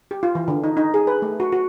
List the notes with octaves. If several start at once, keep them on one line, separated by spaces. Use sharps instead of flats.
G4
F4
E3
D3
D#4
D#4
G#4
B4
A3
F#4
F#4